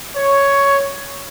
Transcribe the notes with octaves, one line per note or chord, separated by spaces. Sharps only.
C#5